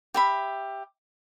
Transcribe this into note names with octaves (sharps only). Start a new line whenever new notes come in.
G4 E5 B5